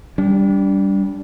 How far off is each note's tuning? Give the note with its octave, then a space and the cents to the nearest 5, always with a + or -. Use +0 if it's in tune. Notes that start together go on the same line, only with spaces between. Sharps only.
G3 +0 D4 -35